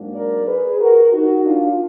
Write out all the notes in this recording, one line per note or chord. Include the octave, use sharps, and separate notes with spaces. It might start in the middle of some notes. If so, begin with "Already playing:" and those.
Already playing: G#2 F#3 A#3 D4
A#4 D5
G#4 B4
F#4 A#4
D#4 F#4
D4 F4